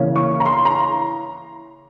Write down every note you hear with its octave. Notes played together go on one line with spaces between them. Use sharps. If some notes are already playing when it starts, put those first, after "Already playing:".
Already playing: C#3 E3 A#3 C#4
C#6
A#5
C6
A#5